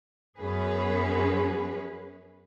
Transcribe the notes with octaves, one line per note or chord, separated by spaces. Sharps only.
F#2 B3 C#4 G#4 B4